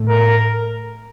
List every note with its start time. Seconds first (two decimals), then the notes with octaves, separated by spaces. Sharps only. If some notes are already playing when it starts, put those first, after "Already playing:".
Already playing: A2 A3
0.09 A#4